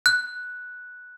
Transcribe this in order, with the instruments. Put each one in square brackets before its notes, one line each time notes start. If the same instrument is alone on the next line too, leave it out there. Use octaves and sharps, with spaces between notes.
[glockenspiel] F#6